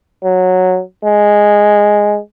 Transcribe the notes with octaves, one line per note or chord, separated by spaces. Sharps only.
F#3
G#3